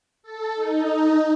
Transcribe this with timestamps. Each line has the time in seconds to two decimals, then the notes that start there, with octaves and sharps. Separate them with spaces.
0.23 A4
0.55 D#4